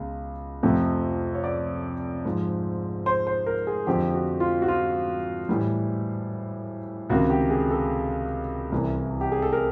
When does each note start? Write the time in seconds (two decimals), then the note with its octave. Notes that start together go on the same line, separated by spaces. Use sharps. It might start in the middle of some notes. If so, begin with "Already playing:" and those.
Already playing: C#2 B2 G#3
0.63 F2 C3 F3 A3
1.35 C#5
1.44 D5
2.25 G#2 F3 G#3
3.06 C5
3.27 C5
3.46 A#4
3.67 G#4
3.87 F2 D3 F3 G4
4.14 F#4
4.40 F4
4.62 F#4
4.68 F4
5.49 A2 E3 G3
7.10 C#2 C3 D#3 F#4
7.30 G4
7.50 G#4
7.70 A4
8.72 C2 C3 E3
9.21 G4
9.32 G#4
9.42 A4
9.53 A#4